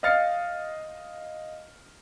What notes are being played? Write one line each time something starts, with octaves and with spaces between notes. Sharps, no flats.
D#5 F5 F6 A6 C7 C#7